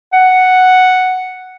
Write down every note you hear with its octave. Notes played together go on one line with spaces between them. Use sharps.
F#5